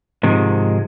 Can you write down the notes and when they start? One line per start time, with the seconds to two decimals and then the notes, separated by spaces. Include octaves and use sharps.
0.23 G#2 C3 D#3 F3 G#3